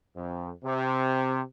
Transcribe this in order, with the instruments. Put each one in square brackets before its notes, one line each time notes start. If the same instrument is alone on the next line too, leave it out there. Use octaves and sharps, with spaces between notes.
[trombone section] F2
C3